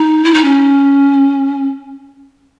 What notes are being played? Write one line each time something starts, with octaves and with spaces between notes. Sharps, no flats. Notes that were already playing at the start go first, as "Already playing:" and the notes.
Already playing: D#4
E4
D#4
C#4